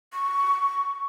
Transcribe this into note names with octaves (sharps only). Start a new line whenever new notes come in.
C#6